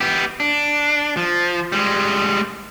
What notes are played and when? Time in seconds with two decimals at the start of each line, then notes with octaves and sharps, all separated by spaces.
0.01 B3 G4
0.40 D4
1.17 F3
1.72 G3 G#3